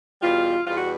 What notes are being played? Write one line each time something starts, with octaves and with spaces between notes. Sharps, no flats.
E2 B2 G3 F4
E2 B2 G3 F4
F#4